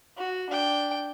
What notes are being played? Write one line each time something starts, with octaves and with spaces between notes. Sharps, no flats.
F#4
D4 G5